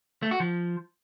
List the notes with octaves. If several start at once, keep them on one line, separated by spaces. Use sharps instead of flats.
A3
F#4
F3